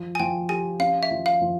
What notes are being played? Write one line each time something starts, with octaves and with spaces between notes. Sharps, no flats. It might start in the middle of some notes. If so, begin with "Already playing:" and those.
Already playing: F3
G#5
F3 G5
G4 G#5
C#4 F5
E5
F3
F5
F3